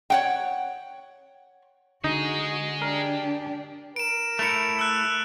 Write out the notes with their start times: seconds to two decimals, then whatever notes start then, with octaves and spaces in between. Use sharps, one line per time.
0.10 C#5 F#5 G5
2.04 D3 D#4 F#4 G#4 D#5
2.82 D4 G4 A#4
3.96 A#4 D7 E7
4.39 A3 E4 C#7 F7
4.79 E6 F#6